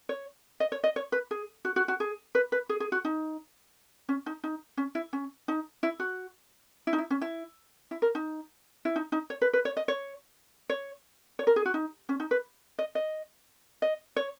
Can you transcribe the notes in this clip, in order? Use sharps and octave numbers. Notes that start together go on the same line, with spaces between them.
C#5
D#5
C#5
D#5
C#5
B4
G#4
F#4
F#4
F#4
G#4
B4
B4
G#4
G#4
F#4
D#4
C#4
D#4
D#4
C#4
E4
C#4
D#4
E4
F#4
E4
D#4
E4
C#4
E4
E4
A#4
D#4
E4
D#4
D#4
C#5
B4
B4
C#5
D#5
C#5
C#5
C#5
A#4
G#4
F#4
D#4
C#4
D#4
B4
D#5
D#5
D#5
C#5